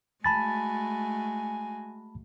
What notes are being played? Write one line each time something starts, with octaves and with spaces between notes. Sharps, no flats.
G#3 A3 F#4 G#5 A5 B5 A6